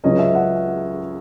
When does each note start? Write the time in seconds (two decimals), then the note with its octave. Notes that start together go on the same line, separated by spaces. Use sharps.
0.04 C#2 C#3 F#3 C#4 D#5
0.19 E5
0.35 F#5